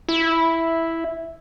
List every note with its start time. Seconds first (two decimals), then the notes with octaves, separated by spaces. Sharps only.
0.09 E4